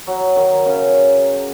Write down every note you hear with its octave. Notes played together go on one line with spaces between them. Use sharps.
F#3
D#3
C#3